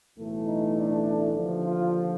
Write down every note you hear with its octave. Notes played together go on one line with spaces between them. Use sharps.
B1 A2 E3 A3
D#4
D4
D#2 D3 F3
F4